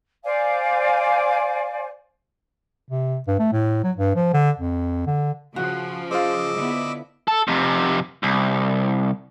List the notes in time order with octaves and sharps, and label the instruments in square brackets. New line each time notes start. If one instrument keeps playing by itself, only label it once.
[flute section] C5 D5 F5 G#5
[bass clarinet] C3
G2
A3
A2
F#3
G2
F3
D3
F2
D3
[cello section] C#3 F3 [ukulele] F#4
[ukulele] F4 C5 [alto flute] G#4 [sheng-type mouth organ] D#5 D6 E6
[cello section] D3 B3 E4
[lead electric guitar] A4
F2 C3
C2